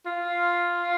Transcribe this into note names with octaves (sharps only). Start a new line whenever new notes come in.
F4